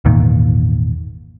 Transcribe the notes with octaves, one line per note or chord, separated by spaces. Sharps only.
G#1 E2 A#2 D#3